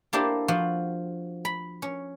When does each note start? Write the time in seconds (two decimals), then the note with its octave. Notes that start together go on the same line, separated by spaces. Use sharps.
0.13 A#3 D4 E4 G4 A4 C5
0.48 F3 F4 F#4
1.45 B5
1.82 C#4